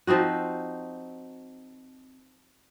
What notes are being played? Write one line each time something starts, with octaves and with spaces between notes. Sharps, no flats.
F3 C4 D#4 F#4